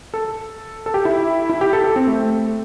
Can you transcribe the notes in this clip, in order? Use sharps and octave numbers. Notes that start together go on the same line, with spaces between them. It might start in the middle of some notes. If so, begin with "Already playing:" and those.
A4
A4
G4
E4
E4
G4
A4
A4
C4
A3